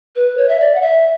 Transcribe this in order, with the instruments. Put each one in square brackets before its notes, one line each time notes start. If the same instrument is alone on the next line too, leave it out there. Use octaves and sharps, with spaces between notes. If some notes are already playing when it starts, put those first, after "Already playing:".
[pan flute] B4
C#5
E5
D5
F#5
E5